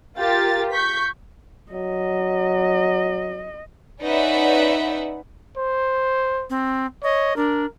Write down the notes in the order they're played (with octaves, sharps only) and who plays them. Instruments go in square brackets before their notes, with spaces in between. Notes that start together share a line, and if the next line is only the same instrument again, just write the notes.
[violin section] F4 G4 A#4 A6
C#6 G6 B6
[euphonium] F#3 [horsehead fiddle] D#5
[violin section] C#4 D#4 B4 D5 E5 F#5
[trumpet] C5
[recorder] C4
[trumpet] C#5 [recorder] D#5
[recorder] D4 [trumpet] A#4